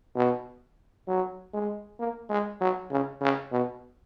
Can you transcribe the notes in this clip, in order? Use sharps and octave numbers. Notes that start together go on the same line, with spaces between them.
B2
F#3
G#3
A#3
G#3
F#3
C#3
C#3
B2